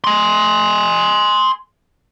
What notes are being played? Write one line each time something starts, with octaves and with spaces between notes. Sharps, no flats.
G#5 C6